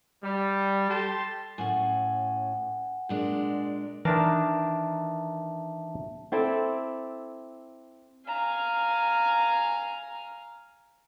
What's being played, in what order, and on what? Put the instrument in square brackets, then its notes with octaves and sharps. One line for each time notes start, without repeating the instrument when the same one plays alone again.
[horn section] G3
G4 A4 A5 C6
[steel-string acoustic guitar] A2 C#4 [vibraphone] F#5 G#5
[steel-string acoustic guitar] A#2 G#3 D4
[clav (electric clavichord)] D#3 D4 A#4 [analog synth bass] E3 [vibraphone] E5 A5
[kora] C4 E4 A4 D5
[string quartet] F5 G#5 A#5